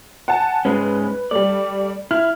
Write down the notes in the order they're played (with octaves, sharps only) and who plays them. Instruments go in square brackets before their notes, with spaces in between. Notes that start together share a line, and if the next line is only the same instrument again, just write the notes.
[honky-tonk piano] F#5 G#5 A5
[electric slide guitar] G#2 G#3 C#4 [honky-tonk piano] B4
[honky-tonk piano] G3 A3 [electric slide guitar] D5
[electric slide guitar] E4 [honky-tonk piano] F6